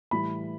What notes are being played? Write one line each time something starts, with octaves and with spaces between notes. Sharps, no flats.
A2 E3 G3 B5